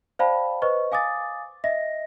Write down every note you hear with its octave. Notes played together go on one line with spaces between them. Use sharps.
C5 D5 F5 G5 A5 B5
B4 C5 D#5 C#6
F5 G#5 D6 D#6 A6
D#5 E5 A#6